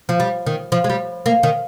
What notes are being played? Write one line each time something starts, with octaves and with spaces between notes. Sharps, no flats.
F3
G3
D#3
F3
G#3
G3
A#3
D#3